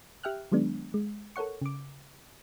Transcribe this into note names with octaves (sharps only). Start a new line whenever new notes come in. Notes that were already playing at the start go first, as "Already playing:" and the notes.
G4 E5 G5 F6 F#6
D#3 F#3 G#3 B3 D4
G#3
A4 A#4 C#5 F#5 C#6
C#3 D6